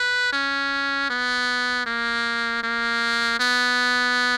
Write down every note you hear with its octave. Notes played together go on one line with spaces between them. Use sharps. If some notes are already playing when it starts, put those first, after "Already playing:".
Already playing: B4
C#4
B3
A#3
A#3
B3